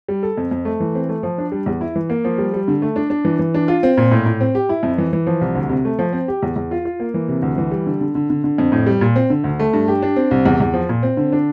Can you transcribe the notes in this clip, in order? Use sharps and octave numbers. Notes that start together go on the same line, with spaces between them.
G3
A4
F2
F2
A3
E3
C4
A3
F3
D4
G3
E2
E4
E3
A#3
F3
G3
G3
D3
A3
D4
D4
E3
E3
D4
F4
C4
A#2
A2
A2
C4
G4
E4
F2
E3
E3
F3
C2
D2
C3
A3
F3
C4
G4
E2
E2
F4
F4
A#3
E3
C3
D2
E3
G3
D3
D3
D3
D3
D3
F2
A2
G3
A#2
C4
D3
D2
A3
G2
G4
D4
C4
C2
E2
E2
F3
A#2
C4
D3
D4